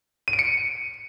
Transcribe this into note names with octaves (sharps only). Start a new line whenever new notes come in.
D#7
D7
C#7